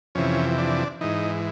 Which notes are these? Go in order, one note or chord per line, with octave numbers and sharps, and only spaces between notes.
F2 C3 E3 C#4
D4
G#2 E3 D#4